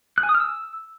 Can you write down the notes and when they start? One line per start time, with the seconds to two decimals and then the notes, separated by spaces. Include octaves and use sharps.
0.18 F#6
0.23 G#5
0.29 D#6
0.35 F6
0.40 E6